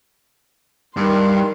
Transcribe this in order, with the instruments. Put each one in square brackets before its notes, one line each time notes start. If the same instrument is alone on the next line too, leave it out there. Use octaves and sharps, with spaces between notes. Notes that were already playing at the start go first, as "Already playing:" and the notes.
[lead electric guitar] G2 [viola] D#3 C6